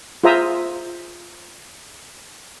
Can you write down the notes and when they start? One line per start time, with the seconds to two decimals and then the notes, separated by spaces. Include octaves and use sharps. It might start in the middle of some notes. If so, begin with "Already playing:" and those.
0.24 F4 G#4 C5 E5 A#5 D#6